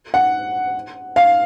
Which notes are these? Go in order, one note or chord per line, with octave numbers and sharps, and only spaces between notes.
F#5
F5